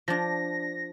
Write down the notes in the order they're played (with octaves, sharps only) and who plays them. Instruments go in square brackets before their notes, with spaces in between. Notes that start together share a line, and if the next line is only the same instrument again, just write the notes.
[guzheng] F3 D4 [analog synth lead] A#6